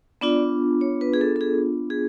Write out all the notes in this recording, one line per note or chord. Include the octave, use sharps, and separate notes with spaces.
B3 D4 F4 D5
C#5
B4
G#4
A4
A4
G#4
G#4